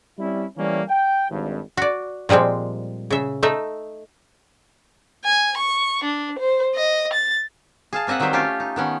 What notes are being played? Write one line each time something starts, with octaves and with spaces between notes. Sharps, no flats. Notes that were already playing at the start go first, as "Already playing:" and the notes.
G3 C4 C#4 E4
E3 G3 A3 A#3 C#4
G5
G#1 G2
F#4 D5
A#2 F3 G3 G#3 C4
C#3 E5
A3 D#4 E5
G#5
C#6
D4
C5
D#5
A6
G#4 F5 A5
A#3 C4 D#5 E5 F#5
D#3 F#3 G3 C5 E5
A3 C#4 F4 G4
D#4
D#3 B3 C#4